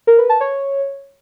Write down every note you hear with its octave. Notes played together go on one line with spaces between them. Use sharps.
A#4
B4
A5
C#5